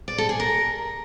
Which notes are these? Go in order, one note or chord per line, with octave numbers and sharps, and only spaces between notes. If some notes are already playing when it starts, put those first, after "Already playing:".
D5
A4
G#4
A#4